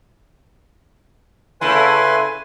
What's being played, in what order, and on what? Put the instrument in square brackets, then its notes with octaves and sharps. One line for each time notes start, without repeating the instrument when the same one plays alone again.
[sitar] C#3 A3 E4 [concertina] B4 G#5 C6